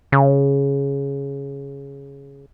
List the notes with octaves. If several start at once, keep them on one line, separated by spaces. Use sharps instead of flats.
C#3